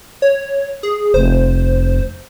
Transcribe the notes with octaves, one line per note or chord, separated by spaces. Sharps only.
C#5
G#4
F1 C5